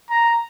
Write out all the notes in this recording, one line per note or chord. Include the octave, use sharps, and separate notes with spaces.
A#5